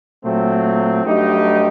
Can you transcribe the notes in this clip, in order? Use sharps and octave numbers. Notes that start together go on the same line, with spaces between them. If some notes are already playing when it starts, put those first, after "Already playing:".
A#2 F#3 A3 C4
G2 F#3 A3 D#4 G4